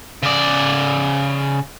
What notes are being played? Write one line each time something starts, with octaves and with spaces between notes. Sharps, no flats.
C#3 D5